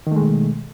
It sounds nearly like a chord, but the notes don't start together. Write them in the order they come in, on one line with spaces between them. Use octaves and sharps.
D#3 A3 G#3 B2